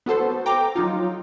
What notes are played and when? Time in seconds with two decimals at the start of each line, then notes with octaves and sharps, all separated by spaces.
0.06 B3 F#4 A4 C5
0.46 G5 A#5 D6
0.76 F#3 D#4 F4